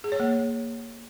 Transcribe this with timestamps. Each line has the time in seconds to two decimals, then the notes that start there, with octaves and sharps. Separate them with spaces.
0.04 G#4
0.12 C#5
0.20 A#3